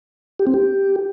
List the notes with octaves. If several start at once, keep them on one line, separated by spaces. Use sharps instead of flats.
G4
C4
G4